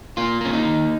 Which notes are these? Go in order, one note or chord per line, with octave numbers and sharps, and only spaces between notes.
A#3 F4
A#3 C#4
D#4
D#3